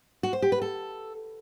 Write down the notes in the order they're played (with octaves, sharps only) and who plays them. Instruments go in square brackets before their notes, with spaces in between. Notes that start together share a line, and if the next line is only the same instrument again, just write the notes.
[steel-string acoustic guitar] F#4
C5
G4
B4
A4